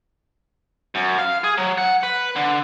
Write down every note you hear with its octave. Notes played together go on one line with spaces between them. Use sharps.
F#2
F5
G#4
F#3
F#5
B4
D3